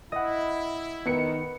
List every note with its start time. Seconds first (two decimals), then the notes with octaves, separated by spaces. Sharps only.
0.12 E4 D#5 F#5
1.06 D#3 B3 C#7